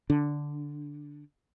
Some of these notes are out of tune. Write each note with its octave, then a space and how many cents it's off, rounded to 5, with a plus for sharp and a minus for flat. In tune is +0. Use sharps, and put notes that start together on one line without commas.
D3 +0 D4 -5